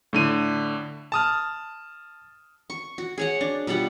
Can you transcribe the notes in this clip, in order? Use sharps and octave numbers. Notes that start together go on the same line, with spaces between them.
A2 D3 D#7
A5 D#6 F6
C#6
F#4
G#4 C#5 F#5
D4
B2 G3 F4 F#5